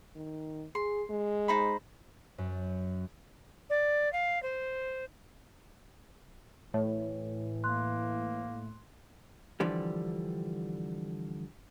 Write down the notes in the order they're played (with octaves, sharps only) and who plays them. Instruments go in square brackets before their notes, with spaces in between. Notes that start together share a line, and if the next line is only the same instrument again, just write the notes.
[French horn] D#3
[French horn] G#4 [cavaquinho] C6
[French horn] G#3
[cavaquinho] D#4 C5 B5
[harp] F#2
[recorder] D5
F5
C5
[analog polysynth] A2 [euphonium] E3 [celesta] C#5
[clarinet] A#3 [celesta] C6 F#6
[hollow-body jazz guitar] D3 E3 F3 G3